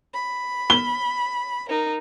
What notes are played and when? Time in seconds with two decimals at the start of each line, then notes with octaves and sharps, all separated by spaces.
0.14 B5
0.70 G7
1.68 D#4 A#4